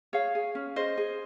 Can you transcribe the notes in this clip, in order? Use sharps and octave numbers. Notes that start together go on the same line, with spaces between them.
G#4 C#5 F5
G#4
C#4
G#4 C5 D#5
G#4